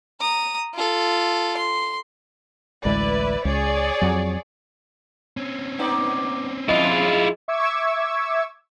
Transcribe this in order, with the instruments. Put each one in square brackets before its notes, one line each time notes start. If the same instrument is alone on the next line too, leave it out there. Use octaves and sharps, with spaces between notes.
[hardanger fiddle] A#5 D#6
F4 A4
C6
[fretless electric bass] A1 D2 G#3 [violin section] E4 B4 D5
[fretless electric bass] C#2 [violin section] G#4 C#5 D5
[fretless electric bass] F2 F#3
[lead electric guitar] C4 C#4
[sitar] B3 D#4 D5
[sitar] F2 G#3 [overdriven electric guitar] E4 F4 [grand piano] D#5
[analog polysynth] E5 C#6 D6 E6 G#6